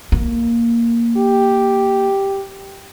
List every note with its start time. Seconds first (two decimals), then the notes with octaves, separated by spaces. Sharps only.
0.12 A#3
1.17 G4